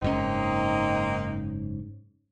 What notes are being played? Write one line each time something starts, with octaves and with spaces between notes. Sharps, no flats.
F#1 G#2 A#3 C4 C#4 D#4